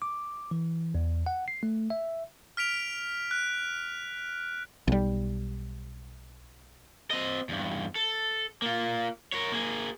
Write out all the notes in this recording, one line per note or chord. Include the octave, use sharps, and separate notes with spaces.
D6
E3
E2
F#5
C7
A3
E5
F6 B6 D7 F7
F#6
B1 G3
C4 D#5
E2 G2
A4
A#3 F4
A#4 C#5
A#3 G#4